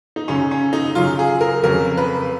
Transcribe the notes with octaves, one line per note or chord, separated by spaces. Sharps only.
D#4
F#2 C#3 F#3 C#4
C#4
D#4
F#2 C#3 F#3 F4
G#4
A#4
F2 C#3 F#3 A#4
B4